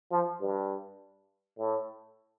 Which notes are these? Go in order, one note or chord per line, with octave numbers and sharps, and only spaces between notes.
F3
G2
A2